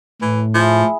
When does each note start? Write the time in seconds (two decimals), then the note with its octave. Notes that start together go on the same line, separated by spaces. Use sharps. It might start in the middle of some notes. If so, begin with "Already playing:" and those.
0.22 A2 E3
0.54 F3 E4 G#4